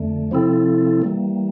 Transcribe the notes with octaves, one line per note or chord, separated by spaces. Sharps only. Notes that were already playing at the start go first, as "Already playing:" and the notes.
Already playing: F2 D3 A3
C3 F3 C4 E4 A4
E3 G3 A#3